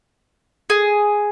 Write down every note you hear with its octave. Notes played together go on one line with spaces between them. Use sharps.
G#4